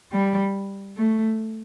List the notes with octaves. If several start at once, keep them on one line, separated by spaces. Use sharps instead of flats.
G3
A3